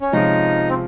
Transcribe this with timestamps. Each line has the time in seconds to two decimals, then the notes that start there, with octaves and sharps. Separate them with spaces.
0.01 C#4
0.13 C3 F3 G#3 C#4 D#4 F4
0.69 C4